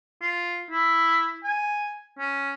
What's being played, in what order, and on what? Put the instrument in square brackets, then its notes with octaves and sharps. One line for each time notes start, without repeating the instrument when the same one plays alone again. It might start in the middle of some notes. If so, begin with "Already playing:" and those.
[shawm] F4
E4
G#5
C#4